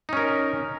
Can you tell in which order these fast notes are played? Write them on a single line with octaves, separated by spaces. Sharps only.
D#4 C#4 A#4